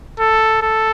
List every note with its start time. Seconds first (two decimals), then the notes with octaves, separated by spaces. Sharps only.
0.19 A4
0.62 A4